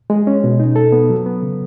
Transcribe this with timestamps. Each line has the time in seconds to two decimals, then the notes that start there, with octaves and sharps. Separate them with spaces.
0.10 G#3
0.27 C#4
0.44 B2
0.60 D#4
0.76 A4
0.92 B3
1.10 F#3
1.26 B3
1.43 C#3